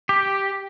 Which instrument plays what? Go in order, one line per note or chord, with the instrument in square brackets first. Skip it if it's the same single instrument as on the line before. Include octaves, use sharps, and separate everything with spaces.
[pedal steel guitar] G4